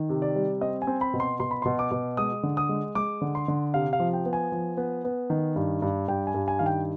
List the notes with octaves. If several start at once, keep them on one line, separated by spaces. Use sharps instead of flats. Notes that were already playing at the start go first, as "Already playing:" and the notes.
Already playing: D#3
C3
D5
G3
C4 D#5
G#5
C4
B5
B2
C6
B2 C6
B5
B2 C6
D6
B2
G#3 D#6
D3
D#6
G#3
G#3 D6
D3
C6
D3
C3 F5
F5
F3
G5
B3
G#5
F3
B3
B3
D#3
G2
G2
G2 G5
G#5
G2
G#5
D#3 F5
G5